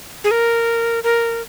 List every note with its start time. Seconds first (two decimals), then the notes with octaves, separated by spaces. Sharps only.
0.24 G#4
0.31 A#4
1.04 A#4